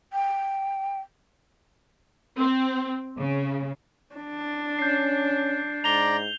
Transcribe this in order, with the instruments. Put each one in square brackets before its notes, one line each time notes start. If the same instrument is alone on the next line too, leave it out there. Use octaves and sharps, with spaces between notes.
[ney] G5
[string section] C4
C#3
[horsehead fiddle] D4
[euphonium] C#4 [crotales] G6 C7
[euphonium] G#2 [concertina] D5 A#5 [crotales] F7 G7